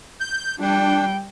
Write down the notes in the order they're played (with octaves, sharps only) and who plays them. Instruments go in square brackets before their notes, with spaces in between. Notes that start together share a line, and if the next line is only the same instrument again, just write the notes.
[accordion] G6
[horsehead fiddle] G3 G5 [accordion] D4